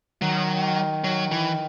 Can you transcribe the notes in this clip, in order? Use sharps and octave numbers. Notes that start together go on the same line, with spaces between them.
D#3 F#3
F#3
E3